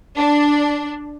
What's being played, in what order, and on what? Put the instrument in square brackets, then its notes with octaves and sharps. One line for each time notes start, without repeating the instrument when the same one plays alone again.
[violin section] D4